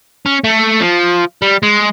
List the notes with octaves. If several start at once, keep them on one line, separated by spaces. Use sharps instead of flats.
C#4
A3
F3
G3
G#3